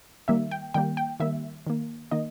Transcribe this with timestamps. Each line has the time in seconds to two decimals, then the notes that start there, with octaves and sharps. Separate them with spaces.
0.28 D#3 G3 A#3 E5
0.51 G5
0.74 D#3 G3 A#3 G5
0.97 G5
1.20 D#3 G3 A#3 E5
1.67 D#3 A#3
2.11 D#3 A#3 D#5